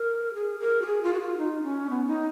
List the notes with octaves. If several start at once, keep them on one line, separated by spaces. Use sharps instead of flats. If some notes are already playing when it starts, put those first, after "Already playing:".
Already playing: A#4
G#4
A#4
F#4
G#4
F4
F#4
F4
D#4
C#4
B3
D#4